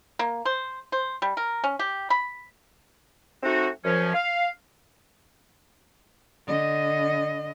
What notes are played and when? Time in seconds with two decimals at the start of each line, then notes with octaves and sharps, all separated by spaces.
0.19 A#3
0.45 C5
0.92 C5
1.22 G3
1.37 A#4
1.64 C#4
1.79 G4
2.10 B5
3.43 A3 C4 D#4 F#4
3.84 F#2 F3 C#4
4.13 F5
6.47 D3 D#5